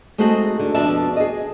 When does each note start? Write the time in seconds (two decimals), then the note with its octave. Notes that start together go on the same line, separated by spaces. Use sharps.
0.18 G#3 A3 C4 D#4 F#4 G#4
0.59 D3
0.74 F2 B2 D4 E5 A5
1.16 G#4 D#5